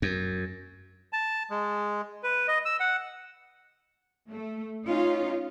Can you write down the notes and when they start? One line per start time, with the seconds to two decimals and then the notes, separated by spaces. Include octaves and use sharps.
0.02 F#2
1.13 A5
1.50 G#3
2.23 B4
2.48 D#5
2.65 E6
2.80 F#5
4.30 A3
4.85 C#4 D#4 F4